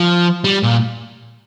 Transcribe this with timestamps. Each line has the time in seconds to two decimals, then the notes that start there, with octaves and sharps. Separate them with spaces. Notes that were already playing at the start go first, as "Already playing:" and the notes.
Already playing: F3
0.44 G3
0.63 A#2